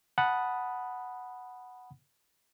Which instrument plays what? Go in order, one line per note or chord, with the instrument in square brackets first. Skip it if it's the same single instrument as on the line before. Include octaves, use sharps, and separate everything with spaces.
[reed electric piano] F#5 A5 B5 D#6